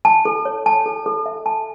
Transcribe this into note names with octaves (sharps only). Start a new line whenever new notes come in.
A5
A4
C#5
A5
A4
A4
E5
A5